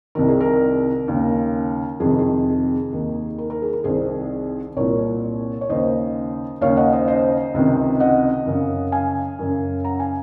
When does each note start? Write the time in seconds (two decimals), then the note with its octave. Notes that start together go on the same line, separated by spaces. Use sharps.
0.15 C2 C3 D#3 A#4
0.28 G#4
0.41 A#4
1.08 D#2 C#3
2.00 F2 C3 D#3 G#4
2.19 G#4
2.93 D#2 D#3
3.38 A#4
3.50 A#4
3.62 G#4
3.73 A#4
3.84 C2 C3 D#3 G#4 C5
4.76 C2 A#2 A#4 C#5
5.61 C#5
5.69 D#2 C#3 C5 D#5
6.61 D#2 C#3 C#5 F5
6.77 D#5 F#5
6.92 C5 D#5
7.07 C5 D#5
7.54 C#2 C3 D#3
8.00 D#5 F#5
8.46 F#2 C#3
8.92 F5 G#5
9.39 F#2 C#3
9.84 F#5 A#5
10.00 F5 G#5